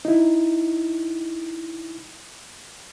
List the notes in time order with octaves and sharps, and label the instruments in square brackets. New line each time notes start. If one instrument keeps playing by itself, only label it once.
[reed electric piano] D#4 E4